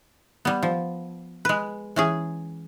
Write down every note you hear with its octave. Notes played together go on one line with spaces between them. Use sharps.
G3 B3
F3
G#3 B4
E3 C#4 G#4